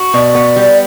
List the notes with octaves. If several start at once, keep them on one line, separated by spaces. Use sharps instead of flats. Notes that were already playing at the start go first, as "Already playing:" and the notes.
Already playing: F#4
B2 D5
B3
G3